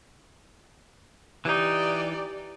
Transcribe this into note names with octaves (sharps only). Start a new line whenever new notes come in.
E3 D#4 G4 D5